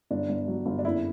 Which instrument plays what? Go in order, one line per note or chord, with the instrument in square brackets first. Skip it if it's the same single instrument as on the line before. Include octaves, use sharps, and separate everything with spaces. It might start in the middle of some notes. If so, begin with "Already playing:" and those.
[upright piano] G1 D4
G1
F#3
G1
D4
F#1 E4